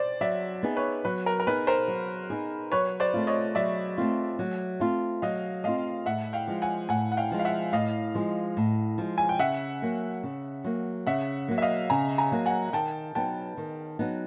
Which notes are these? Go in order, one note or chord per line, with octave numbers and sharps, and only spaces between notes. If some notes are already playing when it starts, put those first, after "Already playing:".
Already playing: C5 D5
F#3 D5 E5
B3 D#4 G#4
B4 C#5
F#3 B4
A#4
A#4
B3 D#4 G#4 B4
A#4 C5
F#3
B3 D#4 G#4
F#3 B4 C#5
C5 D5
A3 C4 F4
C#5 D#5
F#3 D5 E5
A3 C4 F4
F#3
A3 C4 F4
F#3 D#5 F5
A3 C4 F4 D#5 F5
A2 E5 F#5
F5 G5
F3 G#3
F#5 G#5
A2 F#5 G#5
F#5
F5 G5
F3 G#3
F5
E5 F#5
A2 D#5 F5
F3 G#3
A2
F3 G#3
G#5
G5
C#3 E5 F#5
F#3 A#3
C#3
F#3 A#3
C#3 E5 F#5
F#3 A#3
E5
D#5 F5
C#3 G#5 A#5
G#5 A#5
F#3 A#3
F#5 G#5
D#3 G5 A5
F#3 B3 D#4 G5 A5
D#3
F#3 B3 D#4